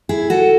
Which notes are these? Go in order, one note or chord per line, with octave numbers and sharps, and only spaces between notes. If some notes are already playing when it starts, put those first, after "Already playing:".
E4 G#4
F#4 A4